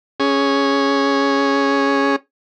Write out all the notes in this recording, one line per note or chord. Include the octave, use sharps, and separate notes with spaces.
C#4 G#4